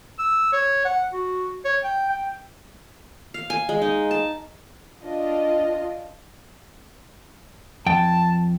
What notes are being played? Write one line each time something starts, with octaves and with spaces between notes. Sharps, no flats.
E6
C#5
F#5
F#4
C#5
G5
G5
F5
G#5
G#3
D#4
A5
D4 F4 D#5
F2 G5 A5